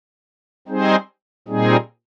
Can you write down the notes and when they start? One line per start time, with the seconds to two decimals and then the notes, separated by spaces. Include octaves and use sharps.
0.68 G3 C4 D#4 G#4 C5
1.48 A#2 G3 C4 D#4 G#4